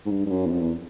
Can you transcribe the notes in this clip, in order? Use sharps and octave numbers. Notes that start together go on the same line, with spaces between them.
G#2
G2
G2
F#2
E2
F2
E2